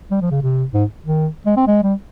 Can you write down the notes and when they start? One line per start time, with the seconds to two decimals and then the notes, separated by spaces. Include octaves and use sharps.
0.11 G3
0.21 F3
0.31 C#3
0.42 C3
0.73 G#2
1.05 D#3
1.46 G#3
1.57 C4
1.67 G#3
1.83 G3